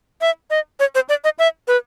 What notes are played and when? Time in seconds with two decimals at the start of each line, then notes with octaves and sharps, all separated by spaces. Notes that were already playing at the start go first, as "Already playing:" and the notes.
0.21 E5
0.50 D#5
0.80 C#5
0.95 C5
1.09 D5
1.24 D#5
1.39 E5
1.68 B4